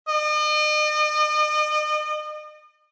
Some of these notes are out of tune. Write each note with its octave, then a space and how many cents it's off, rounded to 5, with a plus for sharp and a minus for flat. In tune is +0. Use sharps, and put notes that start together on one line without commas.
D#5 -40